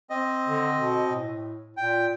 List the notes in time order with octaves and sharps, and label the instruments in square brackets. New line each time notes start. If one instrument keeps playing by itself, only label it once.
[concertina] C4 D#5
[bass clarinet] D3
B2
A2
[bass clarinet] A#2 [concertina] G5